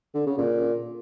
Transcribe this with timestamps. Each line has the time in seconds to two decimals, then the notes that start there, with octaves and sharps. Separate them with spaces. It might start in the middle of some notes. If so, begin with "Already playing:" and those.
0.15 D3
0.26 C#3
0.38 A#2